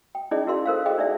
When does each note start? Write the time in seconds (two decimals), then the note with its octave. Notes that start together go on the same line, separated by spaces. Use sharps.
0.15 G5
0.31 C#4 D#4 E4 G#4 D5 D#5
0.47 E4 F#4 A#4 F5 C6
0.66 A4 A#4 C5 F5
0.86 G#4 D#5 G5
0.98 D4 D#4 D5 E5